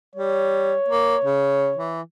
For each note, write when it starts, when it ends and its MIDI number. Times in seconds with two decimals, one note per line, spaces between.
0.16 0.74 55
0.16 1.96 73
0.88 1.16 58
1.24 1.72 49
1.78 2.01 52